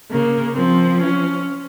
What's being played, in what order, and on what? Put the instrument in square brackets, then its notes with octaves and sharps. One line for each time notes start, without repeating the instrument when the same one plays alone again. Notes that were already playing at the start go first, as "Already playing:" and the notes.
[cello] C#3 [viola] A#3
[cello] F3 [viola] C4
[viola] C#4